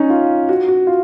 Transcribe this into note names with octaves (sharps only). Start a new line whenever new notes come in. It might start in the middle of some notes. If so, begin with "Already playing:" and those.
Already playing: C#4 D#4
F4
F#4
F#4
F4